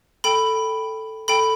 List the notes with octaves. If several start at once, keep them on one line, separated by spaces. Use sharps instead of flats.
A4 G5 B5
A4 G5 B5